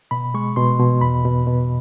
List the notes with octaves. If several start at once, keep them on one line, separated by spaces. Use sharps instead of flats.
B2 B5
G#3 C#6
B2 C6
B2
E2 B5
B2
B2